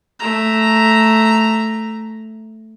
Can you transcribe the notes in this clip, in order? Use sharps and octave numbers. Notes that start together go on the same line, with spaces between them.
A3 A#5